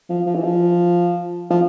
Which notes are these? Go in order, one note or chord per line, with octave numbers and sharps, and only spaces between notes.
F3
F3
E3
F3
F3